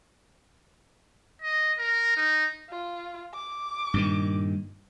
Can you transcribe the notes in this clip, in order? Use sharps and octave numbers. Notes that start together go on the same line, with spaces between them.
D#5
A#4
D#4
F4
D6
G2 A#2 D#3